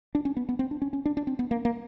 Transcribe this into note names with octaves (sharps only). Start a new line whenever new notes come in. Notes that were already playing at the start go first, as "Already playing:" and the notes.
D4
C#4
B3
B3
C4
D4
C#4
C#4
D4
D4
C4
B3
A#3
A#3